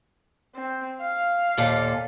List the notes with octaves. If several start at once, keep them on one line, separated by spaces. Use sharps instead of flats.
C4
F5
D#2 A#2 A4